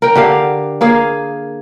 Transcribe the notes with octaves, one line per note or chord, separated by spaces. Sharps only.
A#4 G5
D3 G4 F5
A#3 G#4 F5